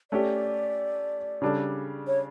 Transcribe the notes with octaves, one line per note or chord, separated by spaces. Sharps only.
A3 C#4 G4 D5
C#3 G3 D4 A4
C#5